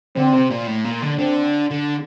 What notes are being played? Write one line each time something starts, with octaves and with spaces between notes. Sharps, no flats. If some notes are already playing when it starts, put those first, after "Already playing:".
D3 C4
C3
A#2
A2
A#2
D3
D3 C4
D3